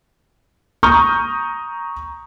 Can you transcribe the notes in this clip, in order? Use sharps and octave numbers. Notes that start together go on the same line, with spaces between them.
A#5 C#6 D#6 F6 G6